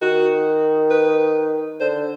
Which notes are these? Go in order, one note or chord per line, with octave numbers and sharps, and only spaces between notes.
D#3 F#4
B4
D3 C5